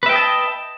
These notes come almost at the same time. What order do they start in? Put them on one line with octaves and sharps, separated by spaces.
B4 E5 G5 D#5 A5